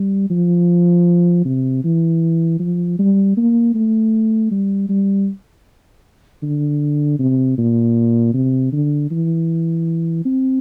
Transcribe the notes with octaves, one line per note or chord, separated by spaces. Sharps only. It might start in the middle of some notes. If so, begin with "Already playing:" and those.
Already playing: G3
F3
C3
E3
F3
G3
A#3
A3
G3
G3
D3
C3
A#2
C3
D3
E3
C4